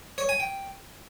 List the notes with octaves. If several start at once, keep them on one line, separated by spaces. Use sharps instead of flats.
C#5
G#5
G5